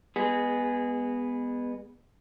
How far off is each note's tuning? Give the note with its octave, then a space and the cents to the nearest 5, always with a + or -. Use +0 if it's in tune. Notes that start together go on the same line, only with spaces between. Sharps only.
G#3 -30 B3 -5 G#4 +0